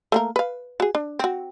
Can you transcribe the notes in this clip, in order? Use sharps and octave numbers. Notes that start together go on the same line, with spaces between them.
A3 A#3 A#4
B4 F5
F#4 G#4
D4
C4 F#4